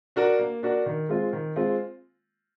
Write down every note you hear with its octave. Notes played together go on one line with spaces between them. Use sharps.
D4 F#4 A#4
A#3
D4 F#4 A#4
D#3
G#3 C4 F4
D#3
G#3 C4 F4